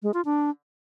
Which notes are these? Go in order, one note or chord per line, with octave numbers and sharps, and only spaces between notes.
G#3
F4
D4